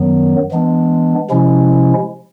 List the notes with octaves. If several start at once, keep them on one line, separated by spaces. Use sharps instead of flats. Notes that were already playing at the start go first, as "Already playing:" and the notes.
Already playing: F#2 D#3 F#3 B3
E3 G#3 B3 D4
C3 F3 G#3 C#4 E4